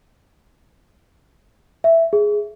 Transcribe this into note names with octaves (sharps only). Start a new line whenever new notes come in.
E5
G#4